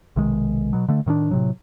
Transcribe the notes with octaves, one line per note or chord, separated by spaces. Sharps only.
B1 C3 D#3 G#3
B2 F#3
D3 A3
A2 D#3 B3 D4
A2 C3 F#3